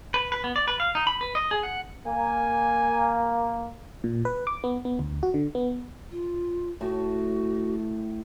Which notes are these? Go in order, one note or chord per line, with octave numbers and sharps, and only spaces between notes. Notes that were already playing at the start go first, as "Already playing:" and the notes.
B4
B4
B3
D5
B4
F5
D#4
B5
B4
D#5
G#4
F#5
A#3 G#5
A#2
B4
D6
B3
B3
D2
F#4
D3
B3
F4
A2 F#4